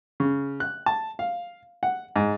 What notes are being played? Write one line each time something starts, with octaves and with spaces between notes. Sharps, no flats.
C#3
F#6
A5
F5
F#5
G#2